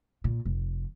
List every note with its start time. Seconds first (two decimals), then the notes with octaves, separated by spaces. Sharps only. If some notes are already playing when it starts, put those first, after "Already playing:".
0.24 A#2
0.45 F1